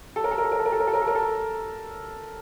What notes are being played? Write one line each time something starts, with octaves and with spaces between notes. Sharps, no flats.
A4
A#4
A4
A#4
A4
A#4
A4
A#4
A4
A#4
A4
A#4
A4
A#4
A4